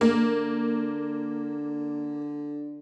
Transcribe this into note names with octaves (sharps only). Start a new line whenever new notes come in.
D3 A#3